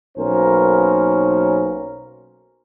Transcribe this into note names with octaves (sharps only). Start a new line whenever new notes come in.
B1 A#3 C#4 A#4 C5